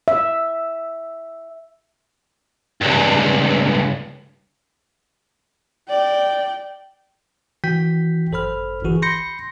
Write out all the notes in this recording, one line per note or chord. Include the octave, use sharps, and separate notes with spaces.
E5
C#2 G2
D5 G5
D#3 E3 F#4 G5 G6 B6
G#1 F#2 A4 C5 B5 F6
G1 C2 E3 F#4 G#4
B5 C6 G6 A#6 C#7